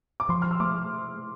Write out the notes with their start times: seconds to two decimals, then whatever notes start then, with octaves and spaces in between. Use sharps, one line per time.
0.20 D6
0.29 F3 C6
0.42 F6
0.51 E6
0.60 A3 D6